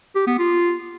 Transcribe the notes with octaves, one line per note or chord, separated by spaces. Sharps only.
G4
B3
F4